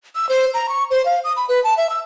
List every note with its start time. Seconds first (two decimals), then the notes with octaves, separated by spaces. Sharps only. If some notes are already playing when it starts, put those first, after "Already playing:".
0.16 E6
0.29 C5
0.54 A#5
0.69 C#6
0.91 C5
1.06 F5
1.24 D#6
1.37 B5
1.49 B4
1.64 A5
1.77 E5
1.90 E6